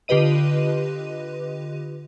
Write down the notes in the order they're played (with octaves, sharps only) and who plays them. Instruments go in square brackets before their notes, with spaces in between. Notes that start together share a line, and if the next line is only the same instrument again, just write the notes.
[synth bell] D3 F4 G4 B4 D#5 D#7